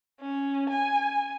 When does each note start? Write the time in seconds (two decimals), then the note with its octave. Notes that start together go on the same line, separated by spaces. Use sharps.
0.20 C#4
0.70 G#5